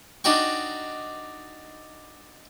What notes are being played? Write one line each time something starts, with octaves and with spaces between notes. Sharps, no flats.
D4 D#4 F#4 G5 C#6